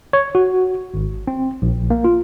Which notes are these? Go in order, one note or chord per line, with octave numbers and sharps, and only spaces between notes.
C#5
F#4
G#1
C4
A#1
A#3
F4